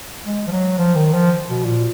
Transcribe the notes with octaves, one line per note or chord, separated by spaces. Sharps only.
G#3
F3
F#3
F3
D#3
F3
B2
A#2